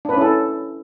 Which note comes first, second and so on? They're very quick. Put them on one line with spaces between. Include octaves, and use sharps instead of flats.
D4 B4 C#4 E4 A4